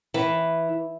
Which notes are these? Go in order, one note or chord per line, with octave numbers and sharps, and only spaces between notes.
E3